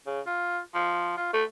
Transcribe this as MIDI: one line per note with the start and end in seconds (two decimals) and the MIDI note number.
0.06 0.20 49
0.27 0.59 65
0.75 1.16 53
1.17 1.32 65
1.33 1.43 57